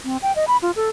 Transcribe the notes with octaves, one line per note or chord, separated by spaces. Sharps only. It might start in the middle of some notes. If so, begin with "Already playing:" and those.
C4
G5
D#5
B5
F4
A4